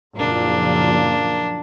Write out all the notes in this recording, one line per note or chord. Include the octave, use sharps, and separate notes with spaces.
F#1 A#2 F3 A#3 D4